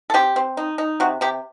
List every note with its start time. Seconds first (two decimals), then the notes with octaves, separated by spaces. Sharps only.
0.10 A4
0.14 C4 G4
0.36 C4
0.57 D#4
0.78 D#4
1.00 C3 F#4
1.21 C3 G4